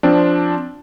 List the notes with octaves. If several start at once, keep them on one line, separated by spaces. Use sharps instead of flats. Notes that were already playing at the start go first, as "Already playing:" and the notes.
F3 C4 D4